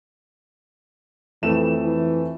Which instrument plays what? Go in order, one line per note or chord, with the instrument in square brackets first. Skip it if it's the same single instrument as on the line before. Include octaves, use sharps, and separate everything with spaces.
[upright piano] F2 A3 E7 [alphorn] E3
[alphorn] E3